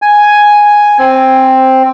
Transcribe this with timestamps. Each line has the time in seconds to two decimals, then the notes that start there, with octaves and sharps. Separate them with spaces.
0.02 G#5
0.99 C4